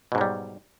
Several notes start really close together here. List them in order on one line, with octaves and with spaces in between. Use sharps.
B2 G#2 F#3 G3